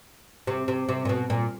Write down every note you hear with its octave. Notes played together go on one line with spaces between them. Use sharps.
C3
C3
C3
A#2
B2
A#2